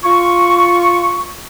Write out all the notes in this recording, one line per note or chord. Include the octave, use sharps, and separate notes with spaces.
F4 C#6